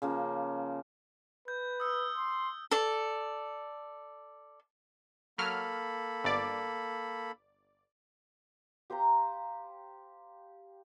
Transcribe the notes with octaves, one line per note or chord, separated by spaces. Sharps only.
C#3 F3 A#3
B4 G6
D#6 E6
C6
A4 D5
F#3 A#3 A4 B5 F6
G1 D5
G4 C5 F5 A#5